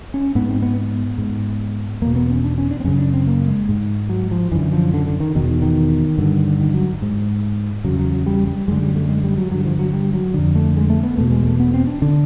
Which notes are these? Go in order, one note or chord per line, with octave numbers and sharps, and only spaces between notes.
C#4
G#2 B3
C4
B3
B3
G#2
E2 B2 A#3
B3
C#4
D4
C#4
D4
C4
F#2 C#3 C#4
D4
C4
A#3
G#3
G#2
F#3
F3
F#2 D3 E3
F3
D3
D3
D#3
E2 B2 D#3
D#3
D#3
G2 D3
D#3
F#3
G#2
E2 C#3 F#3
F#3
F#3
G3
G3
F#2 D3 G#3
G3
A3
G#3
G3
F#3
G2 D3 F#3
F3
F#3
G3
F#3
F2 D3
A3
G#3
A3
B3
E2 B2 A3
G#3
A3
B3
C4
D4
D3 D4